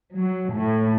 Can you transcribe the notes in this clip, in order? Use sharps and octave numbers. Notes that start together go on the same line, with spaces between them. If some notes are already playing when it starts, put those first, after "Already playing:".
F#3
A2